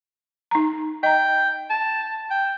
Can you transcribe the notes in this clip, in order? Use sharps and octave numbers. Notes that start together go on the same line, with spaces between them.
D#4 A#5
D#5 G5 A#5
A5
G5